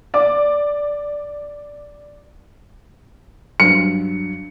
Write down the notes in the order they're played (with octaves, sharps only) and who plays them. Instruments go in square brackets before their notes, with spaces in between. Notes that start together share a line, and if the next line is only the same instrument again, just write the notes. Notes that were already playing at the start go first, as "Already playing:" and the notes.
[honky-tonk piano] D5 D6
[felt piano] G2 F#3 [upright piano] C#7